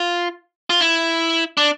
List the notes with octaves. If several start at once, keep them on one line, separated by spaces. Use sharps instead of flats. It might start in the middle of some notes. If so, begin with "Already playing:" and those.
Already playing: F4
F4
E4
D4